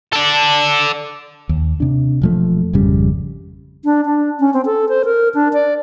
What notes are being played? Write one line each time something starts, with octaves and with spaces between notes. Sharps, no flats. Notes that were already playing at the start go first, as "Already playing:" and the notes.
A4 D5
D#2
C3 D4
E1 F3 A3
G#1 F2 C#3 G3
D4
D4
C#4
C4
A4
C5
A#4
D4
D5